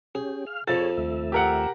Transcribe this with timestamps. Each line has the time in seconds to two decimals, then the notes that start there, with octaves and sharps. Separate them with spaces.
0.15 C#4 G4 G#4
0.47 F5 F6
0.67 F2 F3 G#4 A4 C#5 A6
0.97 D#2 A3 E5
1.32 G4 A#4 F#5